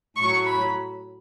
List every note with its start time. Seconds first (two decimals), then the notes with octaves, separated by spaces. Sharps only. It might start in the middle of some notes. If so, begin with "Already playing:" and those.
0.16 A2 F#3 C#6
0.46 B5